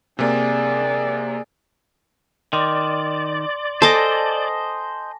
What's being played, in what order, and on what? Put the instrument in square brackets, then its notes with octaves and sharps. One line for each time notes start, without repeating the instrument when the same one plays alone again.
[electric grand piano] C3 A#3 [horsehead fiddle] G#4 D5
[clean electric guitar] D#3 [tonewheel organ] D5 [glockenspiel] C6 D6
[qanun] A4 D6 [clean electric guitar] C5 D#5 [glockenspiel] G#5 A5 A#6